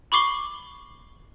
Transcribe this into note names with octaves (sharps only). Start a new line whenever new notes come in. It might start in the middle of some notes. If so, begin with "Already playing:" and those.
B5 C#6 D6 C7 G7